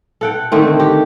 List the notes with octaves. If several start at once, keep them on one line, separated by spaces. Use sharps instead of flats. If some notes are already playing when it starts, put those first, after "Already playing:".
A4 F#5 G5
D3 D#3 A3 C4
G4